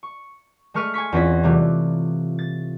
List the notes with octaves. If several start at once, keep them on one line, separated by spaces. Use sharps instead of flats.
C#6
G#3 A3 C#6 F6 B6 D#7
G#5 C6 C#6 B6
E2 C4 C#4 F4 D#5 B6
C3 E3 G3 A3 F4
A6